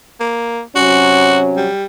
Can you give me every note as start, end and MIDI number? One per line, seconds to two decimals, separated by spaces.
0.20 0.61 58
0.76 1.68 48
0.76 1.68 54
0.76 1.68 61
0.76 1.38 66
1.56 1.84 55